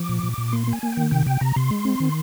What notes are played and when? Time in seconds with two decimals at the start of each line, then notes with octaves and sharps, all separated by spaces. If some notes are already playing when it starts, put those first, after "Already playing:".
Already playing: F3 D6
0.09 A#2
0.23 A#2
0.38 A#2
0.53 A#3 C6
0.67 A#3
0.73 G#5
0.83 A#3
0.92 D#3 G5
1.11 C3 G5
1.27 C3 G5
1.41 C3 A#5
1.56 C3 C6
1.71 G#3
1.85 C4
2.00 D#3